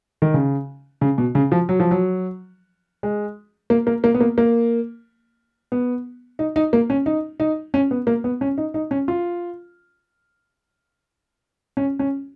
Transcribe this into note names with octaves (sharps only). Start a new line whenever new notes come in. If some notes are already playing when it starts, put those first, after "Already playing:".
D#3
C#3
C#3
B2
C#3
F3
F#3
F3
F#3
G#3
A#3
A#3
A#3
B3
A#3
A#3
B3
D#4
D#4
A#3
C#4
D#4
D#4
C#4
B3
A#3
B3
C#4
D#4
D#4
C#4
F4
C#4
C#4